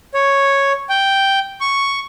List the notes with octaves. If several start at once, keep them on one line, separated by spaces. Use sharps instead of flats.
C#5
G5
C#6